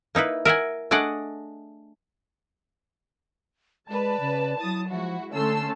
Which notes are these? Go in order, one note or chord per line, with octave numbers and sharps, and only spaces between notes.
A#3 D#4 E4 B4
A#4 E5 F#5 G#5
A3 D4 G#4 D5 D#5 F#5
G#3 B4 D5 A5
C#3
F#3 E4 D#6 A6
F3 G#3 E4 F#4
D3 A3 C#4 A5 C6 E6